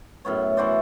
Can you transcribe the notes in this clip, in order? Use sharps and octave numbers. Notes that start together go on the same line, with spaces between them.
F#2 A2 B3 C#5
E3 F#4 C5 D5